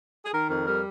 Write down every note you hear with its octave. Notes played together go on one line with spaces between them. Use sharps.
G#4
D#3 A#4
F2 A#4
G3 A#4